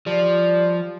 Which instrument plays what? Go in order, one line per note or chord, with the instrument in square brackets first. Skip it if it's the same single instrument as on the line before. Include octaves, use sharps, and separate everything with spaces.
[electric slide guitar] F3 [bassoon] G3